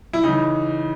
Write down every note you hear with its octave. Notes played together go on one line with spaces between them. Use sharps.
E4
C#3 E3 D#4